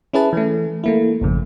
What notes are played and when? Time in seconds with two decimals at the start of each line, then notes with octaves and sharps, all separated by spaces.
0.13 C#4 E4 G#4 B4 A5
0.33 E3 A3
0.84 A3 A#3 E4
1.21 G#1 F2 C#3